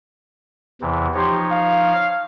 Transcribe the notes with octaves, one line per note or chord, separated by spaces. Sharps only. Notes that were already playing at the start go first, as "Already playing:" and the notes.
E2 C3 E3
F3 D#4 G4 C#5 C6
F5